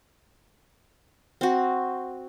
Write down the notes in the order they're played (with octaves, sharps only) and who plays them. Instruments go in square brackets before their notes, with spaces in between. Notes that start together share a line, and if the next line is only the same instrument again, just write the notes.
[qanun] C4 F#4